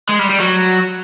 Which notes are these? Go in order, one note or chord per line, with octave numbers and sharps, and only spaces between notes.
G#3
G3
G3
F#3